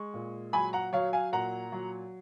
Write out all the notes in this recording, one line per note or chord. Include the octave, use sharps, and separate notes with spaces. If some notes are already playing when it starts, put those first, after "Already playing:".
Already playing: G#3 C#6
A#2
F#3 G#5 B5
F#5 A#5
F#3 C#5 F5
F5 G#5
A#2 F#5 A#5
F#3